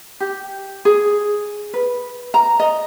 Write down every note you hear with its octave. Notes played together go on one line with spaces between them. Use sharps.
G4
G#4
B4
A#5
D#5